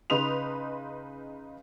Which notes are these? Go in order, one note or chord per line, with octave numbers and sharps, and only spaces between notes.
C#3 D#4 B4 C6 D#6 F7